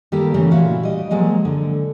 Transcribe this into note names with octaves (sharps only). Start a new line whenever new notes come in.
D#3 G3 A#3 G4 A4 A#4
C#3 E3 A3 A#3 C#4
A#2 E4 F#4 F5
G3 D#5
F3 F#3 G#3 A#3
D3